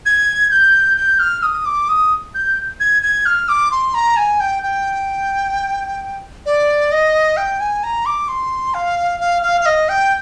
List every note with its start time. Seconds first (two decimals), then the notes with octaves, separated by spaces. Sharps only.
0.06 G#6
0.51 G6
0.97 G6
1.19 F6
1.43 D#6
1.66 D6
1.89 D#6
2.35 G6
2.80 G#6
3.03 G#6
3.26 F6
3.49 D6
3.71 C6
3.94 A#5
4.17 G#5
4.40 G5
4.63 G5
6.46 D5
6.92 D#5
7.37 G5
7.60 G#5
7.84 A#5
8.06 D6
8.28 C6
8.74 F5
9.20 F5
9.43 F5
9.61 F5
9.66 D#5
9.89 G5